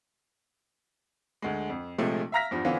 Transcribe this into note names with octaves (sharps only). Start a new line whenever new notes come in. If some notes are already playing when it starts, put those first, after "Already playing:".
D2 G#3
F2
A#1 C3 F3 G#3 A3
E5 F5 A#5 F6 A#6 B6
E2 G2 F3
D3 E3 B3 C#4 F4 C5